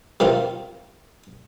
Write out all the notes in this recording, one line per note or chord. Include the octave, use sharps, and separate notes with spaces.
C3 D#3 C4 F4